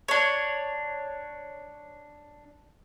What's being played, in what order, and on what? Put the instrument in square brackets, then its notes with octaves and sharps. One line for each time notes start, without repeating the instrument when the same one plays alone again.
[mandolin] D4 C#5